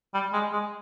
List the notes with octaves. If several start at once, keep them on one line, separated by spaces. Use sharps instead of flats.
G3
G#3
G#3